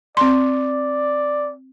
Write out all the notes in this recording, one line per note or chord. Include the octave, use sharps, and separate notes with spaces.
C4 D5 C6